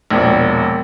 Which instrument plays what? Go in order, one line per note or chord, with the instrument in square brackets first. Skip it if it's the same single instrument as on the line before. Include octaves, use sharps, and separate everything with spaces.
[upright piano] E1 A#1